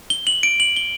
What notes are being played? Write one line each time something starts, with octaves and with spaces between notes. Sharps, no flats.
G7
F#7
D7
F#7
G7